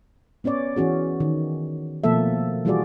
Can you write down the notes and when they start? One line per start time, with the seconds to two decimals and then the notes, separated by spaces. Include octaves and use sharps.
0.44 B3 C#4 C#5 D5
0.76 E3 C#4 F#4 G#4
1.20 D#3
2.04 B2 F3 A3 A#3 A4 E5
2.65 E3 G3 F4 F#4 G#4 D5